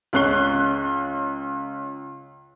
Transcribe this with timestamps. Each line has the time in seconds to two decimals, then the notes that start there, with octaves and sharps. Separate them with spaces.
0.13 C#2 C#4 C#6 F#6 C7 G7